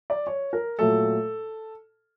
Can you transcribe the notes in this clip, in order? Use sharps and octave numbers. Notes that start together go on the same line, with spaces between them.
D5
C#5
A#4
A#2 F#3 A3 A4